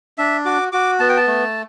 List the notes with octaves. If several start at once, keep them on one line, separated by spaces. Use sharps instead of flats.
D4 E5
F#4 D6
F#4 D6
B3 A5
G5
A5
A3